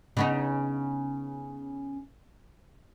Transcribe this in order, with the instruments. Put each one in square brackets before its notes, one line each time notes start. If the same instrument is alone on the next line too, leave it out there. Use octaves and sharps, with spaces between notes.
[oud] C#3 B3 D#4